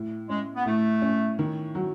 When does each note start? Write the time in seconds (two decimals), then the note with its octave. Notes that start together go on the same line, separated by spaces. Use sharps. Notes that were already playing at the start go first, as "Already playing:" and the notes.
Already playing: A2
0.29 G#3 C#4
0.56 B3
0.66 A2 A3
1.02 C#4
1.39 D#3
1.75 F#3